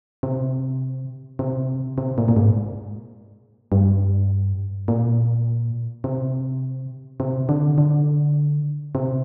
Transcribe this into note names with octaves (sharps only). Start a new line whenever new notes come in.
C3
C3
C3
A#2
A#2
G#2
G2
A#2
C3
C3
D3
D3
C3